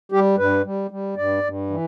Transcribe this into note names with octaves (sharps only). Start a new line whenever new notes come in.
G3 G4
G2 B4
G3
G3
G2 D5
G2
E3